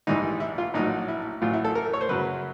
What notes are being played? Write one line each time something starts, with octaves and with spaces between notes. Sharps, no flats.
A#1 G#2 E3 G3 D#4
E4
F4
A#1 A2 F#3 D#4
E4
A1 A2 F#3 F4
E4
A4
A#4
C#5
C5
F#2 C#3 F#3 B4